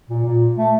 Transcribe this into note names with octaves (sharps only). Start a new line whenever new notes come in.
A#2
A#2
A3